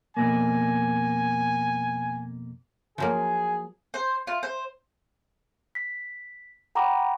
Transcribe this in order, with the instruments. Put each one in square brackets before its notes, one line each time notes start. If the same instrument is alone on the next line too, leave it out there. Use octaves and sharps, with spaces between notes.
[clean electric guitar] F2 B2 A#3 [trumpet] G#5
[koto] F3 F#3 A#3 [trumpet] G#4
[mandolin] C5
F4
C5
[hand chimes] B6
F#5 G5 A#5 B5 C#6 D6